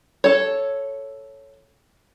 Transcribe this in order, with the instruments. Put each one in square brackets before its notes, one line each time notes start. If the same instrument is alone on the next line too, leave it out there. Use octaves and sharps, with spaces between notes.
[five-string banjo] A4 C#5